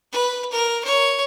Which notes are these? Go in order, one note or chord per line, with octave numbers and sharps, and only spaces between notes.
B4
A#4
C#5